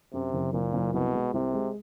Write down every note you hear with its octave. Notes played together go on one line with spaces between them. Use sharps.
F#2 C3
F#1
F#1 A#2
F#1
C2 B2
G#3
C2 C3
G#3